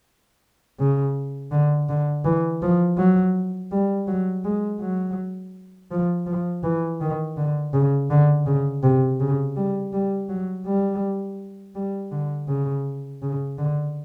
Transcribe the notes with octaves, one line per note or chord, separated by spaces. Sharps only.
C#3
D3
D3
E3
F3
F#3
G3
F#3
G#3
F#3
F3
F3
E3
D#3
D3
C#3
D3
C#3
C3
C#3
G3
G3
F#3
G3
G3
D3
C#3
C#3
D3